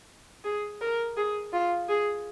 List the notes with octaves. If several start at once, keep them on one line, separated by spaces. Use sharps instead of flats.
G#4
A#4
G#4
F4
G#4